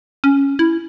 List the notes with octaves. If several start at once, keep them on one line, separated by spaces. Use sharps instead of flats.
C#4
E4